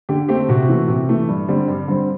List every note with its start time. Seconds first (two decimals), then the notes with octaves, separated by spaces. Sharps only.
0.09 D3 G4
0.29 A3 C4 G4
0.49 C3 F#4
0.69 E3 A3
0.88 C3
1.09 E3 A3
1.28 G2
1.48 D3 G3 C4
1.68 G2
1.88 D3 G3 C4